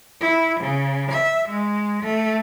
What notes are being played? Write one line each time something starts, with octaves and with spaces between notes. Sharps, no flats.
E4
C#3
E5
G#3
A3